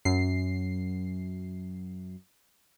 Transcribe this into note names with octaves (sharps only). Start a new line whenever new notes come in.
F#2 C7